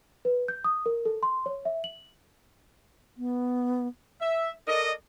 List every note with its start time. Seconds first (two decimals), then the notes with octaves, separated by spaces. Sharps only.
0.25 B4
0.48 G6
0.64 D#6
0.86 A#4
1.05 A4
1.23 C6
1.46 C#5
1.65 E5
1.84 F#7
3.17 B3
4.22 E5
4.68 A4 A#4 D5 D#5